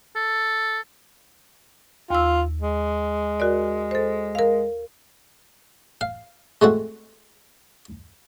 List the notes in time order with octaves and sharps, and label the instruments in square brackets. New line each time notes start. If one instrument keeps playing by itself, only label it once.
[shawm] A4
[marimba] D#2 E6 [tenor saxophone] F4
[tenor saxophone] G#3
[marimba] F#4 A#4 D5
A4 C5
A#4 F5
[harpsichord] F5
G#3 A3 C4 F#4